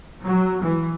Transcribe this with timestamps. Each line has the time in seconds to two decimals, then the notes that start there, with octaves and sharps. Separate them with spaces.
0.25 F#3
0.62 E3